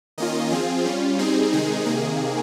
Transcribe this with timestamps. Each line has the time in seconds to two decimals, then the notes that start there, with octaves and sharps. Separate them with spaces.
0.18 D#3 A#3 C#4 F4 D#5
0.51 F3 C4 F4 G#4
0.85 G3 C#4 F4
1.19 G3 C4 D#4 G#4
1.53 C3 D#3 G#3 D#4 G#4
1.85 C3 D#3 A#3 G#4